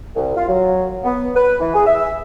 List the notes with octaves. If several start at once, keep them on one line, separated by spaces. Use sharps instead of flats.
C2
F4
F#3
B3
B4
E3
G#4
E5